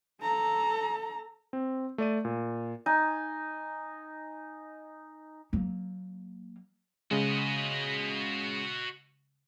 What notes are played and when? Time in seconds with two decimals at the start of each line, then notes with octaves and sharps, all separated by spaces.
0.22 A4 A#5
1.53 C4
1.98 A3 D5 D#7
2.25 A#2
2.86 D#4 G#5
5.53 F#3 A#3
7.11 C#3 G#3 F#4 D#5